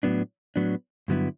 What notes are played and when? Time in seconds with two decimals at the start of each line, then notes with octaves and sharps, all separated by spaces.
0.03 A2 F#3 B3 D4
0.56 A2 F#3 B3 D4
1.08 G2 D3 F#3 B3 E4